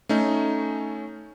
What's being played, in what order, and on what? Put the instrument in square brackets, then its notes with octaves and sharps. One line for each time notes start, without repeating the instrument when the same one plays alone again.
[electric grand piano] A3 C#4 D#4